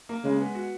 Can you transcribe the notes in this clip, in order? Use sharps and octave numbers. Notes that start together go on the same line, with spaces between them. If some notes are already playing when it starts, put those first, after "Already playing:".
A#3
C#3 G#3
B3
F#4